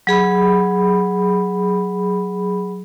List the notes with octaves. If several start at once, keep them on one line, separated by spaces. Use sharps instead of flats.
F#3 G#4 B5